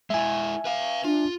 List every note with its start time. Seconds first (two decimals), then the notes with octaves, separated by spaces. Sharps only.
0.10 G#3 E4 E5 G#5
0.65 B4 F5
1.05 D4 F4